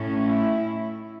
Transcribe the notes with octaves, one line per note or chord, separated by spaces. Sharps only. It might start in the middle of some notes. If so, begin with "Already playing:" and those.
Already playing: A2 A3 C#4
E4